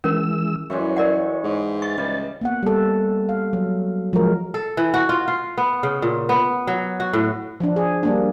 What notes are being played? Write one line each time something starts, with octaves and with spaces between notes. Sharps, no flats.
E3 G#3 C#4 A#4 E6
F#2 E3 G3 G#3 C#5
A#4 D5 F#5
G#2
C#6 A6
C#2 G3
A#3 B3 F#5
G3 A4
F5
F#3
F3 F#3 G#3 A#4
A4
E3
F#4
F4
F4
B3
C#3
A#2
B3
F#3
F#4
A2
F3 D4
G#4
G3 A#3 D4